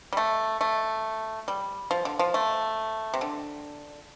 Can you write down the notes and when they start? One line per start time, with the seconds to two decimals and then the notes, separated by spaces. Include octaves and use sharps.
0.13 G3
0.17 A3
0.61 A3
1.48 G3
1.91 F3
2.05 D3
2.19 F3
2.34 A3
3.14 C3
3.21 D3